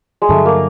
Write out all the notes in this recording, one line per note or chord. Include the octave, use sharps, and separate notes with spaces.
G#3
G2 D3 F#3 A3
A#3